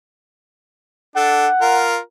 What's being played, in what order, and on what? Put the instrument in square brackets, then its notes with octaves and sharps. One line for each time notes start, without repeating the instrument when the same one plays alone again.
[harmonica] D4 A4 [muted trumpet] F#5
[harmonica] F4 A#4